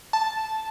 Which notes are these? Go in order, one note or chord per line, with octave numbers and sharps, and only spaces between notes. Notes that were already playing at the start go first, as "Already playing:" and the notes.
A5